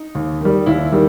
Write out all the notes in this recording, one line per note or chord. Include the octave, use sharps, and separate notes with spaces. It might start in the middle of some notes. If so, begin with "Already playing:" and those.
Already playing: D#4
D#2
D#3 G3
D#2 E4
D#3 G3